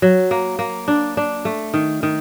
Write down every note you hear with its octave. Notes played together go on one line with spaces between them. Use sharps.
F#3
A#3
A#3
D4
D4
A3
D#3
D#3